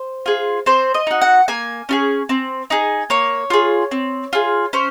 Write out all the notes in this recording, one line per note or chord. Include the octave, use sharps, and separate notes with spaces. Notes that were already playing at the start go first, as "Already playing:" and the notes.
Already playing: C5
F4 G#4
C4 C5
D#5
D#4 F#4
F#5
A#3 G#5
C#4 F4 G#4
C4
D#4 G#4
A#3 C#5
F4 G#4
C4
F4 G#4
C#4 C5